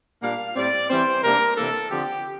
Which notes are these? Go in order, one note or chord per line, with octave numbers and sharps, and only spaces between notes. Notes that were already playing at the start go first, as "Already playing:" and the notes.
A#2 G3 A#3 D4 F5
A2 G3 C4 D5
E3 G3 C4 C5
C3 G3 A#3 D4 A#4
C3 E3 A#3 D4 A4
D3 F3 C4 G4